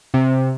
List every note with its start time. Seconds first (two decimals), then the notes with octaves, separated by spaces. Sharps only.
0.14 C3